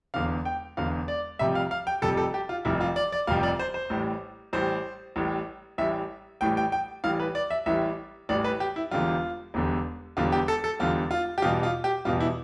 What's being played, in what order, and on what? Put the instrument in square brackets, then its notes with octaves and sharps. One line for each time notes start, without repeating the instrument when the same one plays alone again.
[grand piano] E1 E2 D3 F5
G5
E1 E2 D3 F5
D5
F1 F2 C3 G3 E5
F5
F5
G5
F1 F2 C3 G3 A4
A4
G4
F4
F1 F2 C3 G3 E4
F4
D5
D5
F1 F2 C3 G3 F5
D5
C5
C5
A1 A2 G3
A1 A2 G3 C5
A1 A2 G3
A1 A2 G3 E5
A1 A2 E3 G3 G5
G5
G5
A1 A2 E3 G3 F5
B4
D5
E5
A1 A2 E3 G3 E5
A1 A2 E3 G3 D5
B4
G4
E4
E1 E2 D3 G3 F4
E1 E2 D3 G3
E1 E2 D3 G3 F4
G4
A4
A4
E1 E2 D3 G3 F4
F4
G4
E2 B2 G3 F4
F4
G4
E2 B2 G3 F4
E4